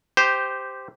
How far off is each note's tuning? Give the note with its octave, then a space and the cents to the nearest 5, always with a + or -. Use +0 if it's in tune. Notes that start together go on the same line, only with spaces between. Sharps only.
G4 +0 C5 -10